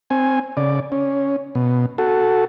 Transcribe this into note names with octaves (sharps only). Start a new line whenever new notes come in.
C4 G#5
C#3 D5
C#4
B2
F#4 A4